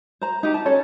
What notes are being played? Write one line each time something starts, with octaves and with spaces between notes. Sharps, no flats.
C5 A#5
D#4 G4
A5
C#4 A4 C#5